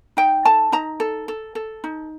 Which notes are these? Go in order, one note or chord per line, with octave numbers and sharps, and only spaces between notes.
D#4 G5
A4 A5
D#4 A#5
A4
A4
A4
D#4